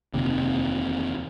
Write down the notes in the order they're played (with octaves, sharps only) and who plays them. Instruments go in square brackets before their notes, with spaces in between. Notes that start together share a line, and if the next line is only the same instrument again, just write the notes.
[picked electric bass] F1 D#2 C3